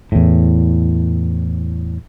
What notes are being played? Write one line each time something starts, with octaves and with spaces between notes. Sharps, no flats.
E2 A2